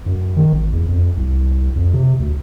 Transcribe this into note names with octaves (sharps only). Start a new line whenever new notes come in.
F#2
D#3
G#1
E2
F2
C2
F2
C3
D2